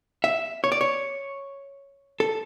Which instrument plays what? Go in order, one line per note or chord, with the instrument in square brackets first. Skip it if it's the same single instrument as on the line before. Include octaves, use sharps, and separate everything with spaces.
[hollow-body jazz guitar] E5
C#5
D5
C#5
A4